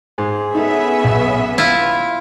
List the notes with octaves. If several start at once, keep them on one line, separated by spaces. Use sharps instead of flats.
G#2 G#4
B3 C#4 D#4 A4 E5
B1
E4 F4